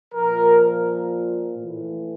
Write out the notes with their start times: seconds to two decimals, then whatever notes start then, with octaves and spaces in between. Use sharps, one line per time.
0.14 A#2 F3 A#4
1.58 A2 E3